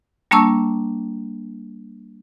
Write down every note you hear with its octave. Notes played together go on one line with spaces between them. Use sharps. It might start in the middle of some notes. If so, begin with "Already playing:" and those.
G3 A#3 D4 A5 C#6 E6